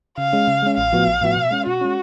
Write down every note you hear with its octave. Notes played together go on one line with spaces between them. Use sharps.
C#3 F5
G#3 C#4
C#3
G#3 C#4
A1 F5
A2 F3 B3 F#4
A1
A2 F3 B3 F#4
B2
G#3 C#4
B2 F#4
G#3 C#4